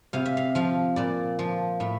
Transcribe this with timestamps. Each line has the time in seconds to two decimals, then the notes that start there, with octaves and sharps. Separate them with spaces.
0.13 C3 F5
0.25 E5
0.37 F5
0.55 F3 F5
0.96 A#2 D5
1.39 F3
1.80 A2 E5